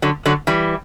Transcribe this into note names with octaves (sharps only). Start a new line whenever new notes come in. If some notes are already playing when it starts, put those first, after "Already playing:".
D3 F#3
D3 F#3
E3 G3